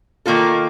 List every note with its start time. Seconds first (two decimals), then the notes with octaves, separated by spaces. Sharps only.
0.26 D#3 A#3 F4 A4